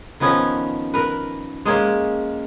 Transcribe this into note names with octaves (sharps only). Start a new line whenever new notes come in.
D#3 F3 B3 C#4
A#4 B4
G#3 A#3 C#4